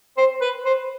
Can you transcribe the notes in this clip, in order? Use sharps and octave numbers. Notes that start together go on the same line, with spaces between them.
C5
B4
C5